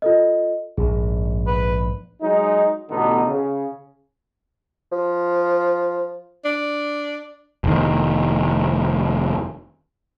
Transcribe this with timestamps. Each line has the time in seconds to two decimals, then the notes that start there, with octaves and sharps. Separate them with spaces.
0.02 F4 A4 D#5
0.77 A#1 G#2 G#4
1.47 B4
2.22 F#3 G#3 D#4
2.90 A1 B2 D3 B3 D#4
3.27 C#3
4.92 F3
6.45 D4
7.64 F1 D#3